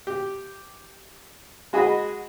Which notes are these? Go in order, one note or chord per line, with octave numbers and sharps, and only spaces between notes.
G4
G#3 F#4 G#4 D#5 B5